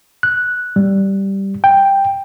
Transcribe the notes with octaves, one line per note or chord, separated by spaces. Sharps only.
F#6
G3
G5